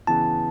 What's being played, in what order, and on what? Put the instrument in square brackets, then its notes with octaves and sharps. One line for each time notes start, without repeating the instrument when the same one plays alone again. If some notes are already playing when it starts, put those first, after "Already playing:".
[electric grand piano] C#3 E3 B3 E4 [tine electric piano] A5